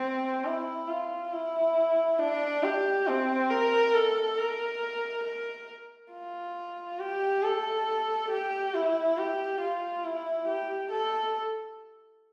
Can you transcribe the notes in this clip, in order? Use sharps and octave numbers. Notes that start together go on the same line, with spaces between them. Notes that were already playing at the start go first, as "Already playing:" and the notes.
Already playing: C4
E4
F4
E4
D4
G4
C4
A#4
A4
A#4
A#4
F4
G4
A4
G4
E4
G4
F4
E4
G4
A4